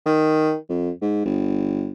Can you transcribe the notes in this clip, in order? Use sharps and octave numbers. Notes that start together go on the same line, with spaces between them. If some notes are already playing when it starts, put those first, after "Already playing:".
D#3
F2
G#2
G1